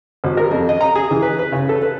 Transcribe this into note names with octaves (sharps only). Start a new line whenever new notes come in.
G#1
A#4
F2
D#5
A#5
G#4
E3
B4
B4
C#3
A4
B4